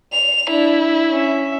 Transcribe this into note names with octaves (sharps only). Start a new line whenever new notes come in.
F7
D4 E4
C#4 E5